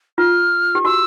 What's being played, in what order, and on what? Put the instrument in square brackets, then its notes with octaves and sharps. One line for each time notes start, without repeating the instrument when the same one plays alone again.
[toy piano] F4 [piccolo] F6
[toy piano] G4
[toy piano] F#4 [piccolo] E6